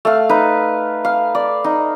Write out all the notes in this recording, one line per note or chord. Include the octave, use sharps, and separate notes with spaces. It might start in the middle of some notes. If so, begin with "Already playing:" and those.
A3 F5
D#4 B4
F5
D5
D#4